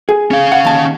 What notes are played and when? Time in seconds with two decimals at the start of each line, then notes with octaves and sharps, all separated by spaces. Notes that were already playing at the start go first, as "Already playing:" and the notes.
0.09 G#4
0.31 C#4 F5
0.52 F#5
0.65 D#2 A5